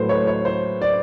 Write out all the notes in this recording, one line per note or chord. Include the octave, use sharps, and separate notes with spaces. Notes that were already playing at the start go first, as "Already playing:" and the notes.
Already playing: A2 F#3 A3 B4 C5
C#5
C#5
C5
D5